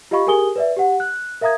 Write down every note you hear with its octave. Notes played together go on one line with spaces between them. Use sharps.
F4 G4 D#5 F5 B5 C#6
G4 G#4 A#4 G#5 D#6 G7
B4 D5 E5
G4 F#5
F#6
A#4 E5 F5 A#5 D#6 G#6